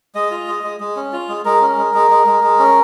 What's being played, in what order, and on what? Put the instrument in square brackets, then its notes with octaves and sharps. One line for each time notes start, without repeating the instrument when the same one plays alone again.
[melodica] G#3 D#5
F4
G#3
G#3
G#3
C#4
F4
G#3
G#3 A#4
C#4
G#3
G#3
G#3
G#3
G#3
C#4